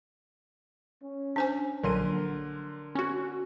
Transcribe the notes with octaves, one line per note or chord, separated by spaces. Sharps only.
C#4
D4 C5 G#5
A#1 D3 F#3 A#4 C6 D#7
C#4 F#4